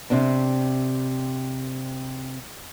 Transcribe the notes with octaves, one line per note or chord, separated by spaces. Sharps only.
C3 C4 D4